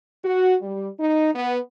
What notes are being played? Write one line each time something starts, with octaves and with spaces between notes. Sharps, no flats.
F#4
G3
D#4
B3